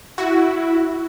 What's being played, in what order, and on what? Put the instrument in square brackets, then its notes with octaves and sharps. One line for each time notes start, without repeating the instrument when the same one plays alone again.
[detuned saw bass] E4 [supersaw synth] F#4